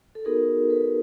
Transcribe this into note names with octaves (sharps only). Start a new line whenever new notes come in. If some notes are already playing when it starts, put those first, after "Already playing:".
A4
B3 D#4 F#4 G#4 A#4
A4 B4